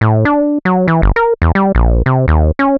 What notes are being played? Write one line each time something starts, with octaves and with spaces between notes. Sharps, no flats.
A2
D4
F#3
E3
G1
A#4
E2
G3
A#1
C3
D#2
C#4